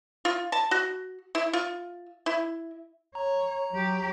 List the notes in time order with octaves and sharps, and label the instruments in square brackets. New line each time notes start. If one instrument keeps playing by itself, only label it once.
[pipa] F4
A5
F#4
E4
F4
E4
[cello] C#5 [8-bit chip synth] A#5
[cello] F#3 G4